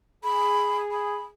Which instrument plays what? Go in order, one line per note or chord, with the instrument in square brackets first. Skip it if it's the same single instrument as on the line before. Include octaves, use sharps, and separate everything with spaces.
[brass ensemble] G#4 [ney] B5
[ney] B5